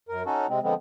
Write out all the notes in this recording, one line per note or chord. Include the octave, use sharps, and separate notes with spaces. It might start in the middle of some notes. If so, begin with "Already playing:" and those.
F#2 A#4
C#4 D#4 F#4 A4
C3 G#3 C4
D3 F3 G#3 B3 C4